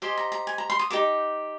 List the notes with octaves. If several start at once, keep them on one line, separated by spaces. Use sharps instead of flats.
G4 C5 D#5 G#5
A#5
A#5
G#5
A#5
C6
D#6
D#4 G4 A#4 D6